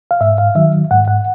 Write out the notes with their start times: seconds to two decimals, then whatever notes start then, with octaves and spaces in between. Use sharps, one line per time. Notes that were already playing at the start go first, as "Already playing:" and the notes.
0.11 F5
0.21 G#2 E5
0.38 F5
0.55 D#3 F#3 E5
0.91 G#2 F#5
1.08 F#5